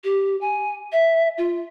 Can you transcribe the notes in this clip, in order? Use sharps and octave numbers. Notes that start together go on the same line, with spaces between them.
G4
G#5
E5
F4